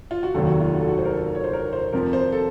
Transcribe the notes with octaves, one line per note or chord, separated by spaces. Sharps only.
F4
F#4
F1 D#2 D#3 F#3 A4
F#4
F4
F#4
A4
F#4
C5
A#4
A4
C#5
C5
A#4
C5
F2 C3 F3 A#4
C5
A4